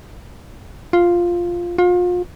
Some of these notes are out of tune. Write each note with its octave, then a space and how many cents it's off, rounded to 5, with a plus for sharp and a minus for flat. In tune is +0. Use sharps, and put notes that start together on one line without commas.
F4 +0
F4 +35